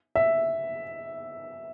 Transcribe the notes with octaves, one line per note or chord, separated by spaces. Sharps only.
E5